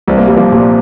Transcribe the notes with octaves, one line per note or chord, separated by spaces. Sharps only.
C2 C4
A#3
C2 G3
F3 A#3
A#2 G3